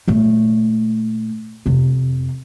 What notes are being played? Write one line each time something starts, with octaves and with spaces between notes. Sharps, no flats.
A#2 A3
F2 C3